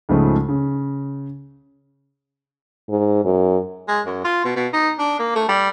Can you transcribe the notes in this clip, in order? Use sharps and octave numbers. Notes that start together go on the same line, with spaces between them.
C#2 G#2 C#3 F3 G#3 A3
C#3
G#2
F#2
G#3
F#2
F4
B2
B2
D#4
D4
A#3
A3
G3